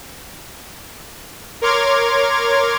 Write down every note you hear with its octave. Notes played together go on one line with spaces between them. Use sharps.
A#4 C#5 C6 D6 F6 G#6